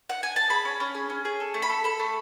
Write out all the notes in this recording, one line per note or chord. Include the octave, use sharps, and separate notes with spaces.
F#5
G#5
A5
G#4 B5
C#4
C#4
G#4
C#4
G#4
A4
A3
B5
A4
A4 B5
A3